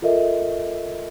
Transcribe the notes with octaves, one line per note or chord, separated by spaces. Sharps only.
F4 A4 A#4 D#5 E5